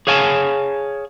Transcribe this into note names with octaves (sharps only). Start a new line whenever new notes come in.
G#4 C#5 F5 G#5 A5